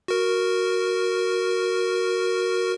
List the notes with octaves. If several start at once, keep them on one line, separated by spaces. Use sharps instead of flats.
F#4 A#4